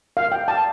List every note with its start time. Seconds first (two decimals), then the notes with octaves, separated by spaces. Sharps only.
0.17 F5
0.32 G5
0.48 A5